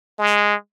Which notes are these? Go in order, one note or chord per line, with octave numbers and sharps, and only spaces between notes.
G#3